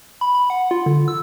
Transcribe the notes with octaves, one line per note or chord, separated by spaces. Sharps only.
B5
B5
F#5
F4
D3
E6